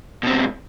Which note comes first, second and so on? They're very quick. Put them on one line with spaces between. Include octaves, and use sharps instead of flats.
B2 C4 G#2